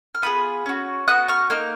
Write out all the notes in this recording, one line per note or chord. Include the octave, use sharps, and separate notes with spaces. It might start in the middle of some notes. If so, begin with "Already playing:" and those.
F6
B3 F4 G#4 B5 D#6
C#4 F#4
B3 F#4 D#6 F#6
C#6 F6
A#3 D#4 F6